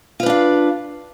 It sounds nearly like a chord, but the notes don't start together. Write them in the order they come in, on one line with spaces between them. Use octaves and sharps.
F4 B4 D4 F5